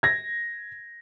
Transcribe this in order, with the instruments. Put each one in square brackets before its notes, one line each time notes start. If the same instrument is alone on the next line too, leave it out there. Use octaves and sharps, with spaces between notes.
[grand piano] G#6 A#6